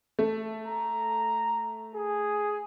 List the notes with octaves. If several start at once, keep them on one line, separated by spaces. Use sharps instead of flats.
A3
A#5
G#4